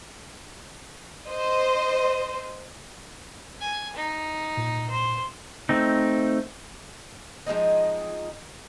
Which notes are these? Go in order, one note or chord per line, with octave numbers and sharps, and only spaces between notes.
C5 D#5
G#5
D#4
A#2
C5
A3 C4 D#4
F3 G#3 C4 D#4